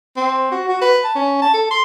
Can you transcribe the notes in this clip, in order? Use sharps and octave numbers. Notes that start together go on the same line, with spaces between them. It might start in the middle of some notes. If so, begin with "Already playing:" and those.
C4
F#4
F#4
B4
A5
C#4
A5
A4
C6